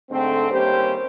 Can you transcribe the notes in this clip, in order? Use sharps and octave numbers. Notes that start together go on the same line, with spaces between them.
G#2 D3 A3 C4
D#2 G3 A#3 C#4 G4 C5